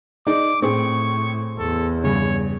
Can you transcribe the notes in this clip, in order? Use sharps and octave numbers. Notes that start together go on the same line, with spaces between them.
D#4 G#4 D5 D6
A2 C4 G#4 C#6
E2 A4
G2 C#3 C#5